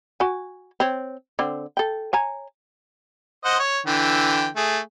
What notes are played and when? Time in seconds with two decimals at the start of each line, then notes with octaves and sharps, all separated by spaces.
0.20 F#4 G#5
0.80 C4 C#5
1.39 D3 C4
1.77 A4 G5
2.13 C#5 G#5 A#5
3.45 C5 D#5 F#5
3.60 C#5
3.86 D3 E3 G5
4.56 A3 G#4